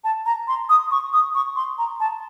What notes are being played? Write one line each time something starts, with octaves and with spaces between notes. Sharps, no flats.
A5
A#5
C6
D#6
C#6
D#6
C#6
C6
A#5
A5